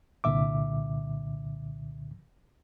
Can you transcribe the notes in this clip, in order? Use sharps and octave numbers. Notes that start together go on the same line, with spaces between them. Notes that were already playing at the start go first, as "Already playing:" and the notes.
C2 A#2 D3 E5 D6